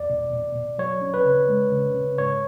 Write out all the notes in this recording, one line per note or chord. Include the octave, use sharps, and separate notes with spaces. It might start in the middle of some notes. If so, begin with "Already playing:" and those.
Already playing: E2 D5
B2
B2
B2
F#3 C#5
C#4
B4
C#3
G#3
C#3
C#3
G#2 C#5